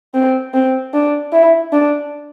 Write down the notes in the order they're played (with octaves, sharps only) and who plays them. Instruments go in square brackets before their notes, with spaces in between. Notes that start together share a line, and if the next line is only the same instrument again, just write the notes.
[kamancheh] C4
C4
D4
E4
D4